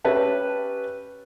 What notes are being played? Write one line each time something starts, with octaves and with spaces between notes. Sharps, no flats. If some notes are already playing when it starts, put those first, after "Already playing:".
C#4 G4 B4 E5 A5